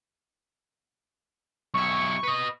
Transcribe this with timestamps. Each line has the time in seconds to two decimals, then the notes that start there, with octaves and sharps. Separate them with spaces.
1.74 B1 E4 C#6
2.23 B4 D#5